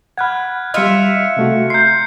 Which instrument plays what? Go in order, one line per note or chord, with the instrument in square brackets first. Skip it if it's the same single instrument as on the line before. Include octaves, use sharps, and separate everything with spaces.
[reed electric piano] F#5 B5 [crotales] F6 F#6 G#6
[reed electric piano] G3 D#5 [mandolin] F4 E5 [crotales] F6 C#7
[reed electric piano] C3 A3 F#4
[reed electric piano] A#5 C6 [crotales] G6 C7